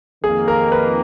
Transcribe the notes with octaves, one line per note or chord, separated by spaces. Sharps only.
F2 D#3 A#3 G#4
A#4
B4